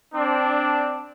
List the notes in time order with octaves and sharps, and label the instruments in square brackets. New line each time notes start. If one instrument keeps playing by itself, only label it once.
[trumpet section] C4 D4